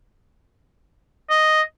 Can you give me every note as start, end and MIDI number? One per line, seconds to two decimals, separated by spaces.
1.30 1.61 75